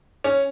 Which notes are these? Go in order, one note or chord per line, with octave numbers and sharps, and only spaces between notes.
C#4